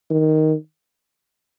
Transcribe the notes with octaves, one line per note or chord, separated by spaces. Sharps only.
D#3